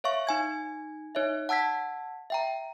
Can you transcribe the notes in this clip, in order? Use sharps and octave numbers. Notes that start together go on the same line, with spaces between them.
C#5 E5 F5 C#6
D#4 G#5 G#6
D#4 C#5 D#5 E5
F#5 A5 E6 G#6 B6
E5 G5 A#5